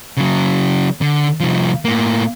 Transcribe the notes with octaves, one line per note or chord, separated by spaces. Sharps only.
C#3 F#3
D3
C2 F3
A2 A#3